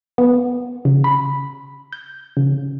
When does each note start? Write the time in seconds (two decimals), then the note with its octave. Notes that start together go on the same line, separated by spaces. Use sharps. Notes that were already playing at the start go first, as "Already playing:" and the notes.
0.18 B3
0.85 C#3
1.04 B5
1.93 G6
2.37 C#3